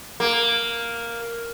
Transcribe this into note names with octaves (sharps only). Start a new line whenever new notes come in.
A#3